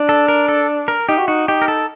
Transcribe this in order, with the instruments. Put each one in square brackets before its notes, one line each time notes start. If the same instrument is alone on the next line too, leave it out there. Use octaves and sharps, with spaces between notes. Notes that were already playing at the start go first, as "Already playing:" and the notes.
Already playing: [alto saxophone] D4
[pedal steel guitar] A4
A#4
A4
A#4
[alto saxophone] D#4 [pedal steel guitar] G4
[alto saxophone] F#4
[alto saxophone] D#4 [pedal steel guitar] F#4
[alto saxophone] D#4 [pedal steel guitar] G4
[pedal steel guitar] A#4
A4